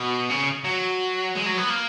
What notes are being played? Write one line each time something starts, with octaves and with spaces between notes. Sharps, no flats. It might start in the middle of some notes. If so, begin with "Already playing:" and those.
Already playing: B2
C#3
F#3
G#3
F#3
B3
A#3